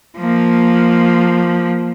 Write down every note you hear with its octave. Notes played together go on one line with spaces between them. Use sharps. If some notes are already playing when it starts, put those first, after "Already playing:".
F3 A#3